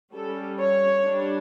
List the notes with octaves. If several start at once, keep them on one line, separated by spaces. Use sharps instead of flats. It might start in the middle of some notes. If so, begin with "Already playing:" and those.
G3 C#4 A4
C#5
G3 D4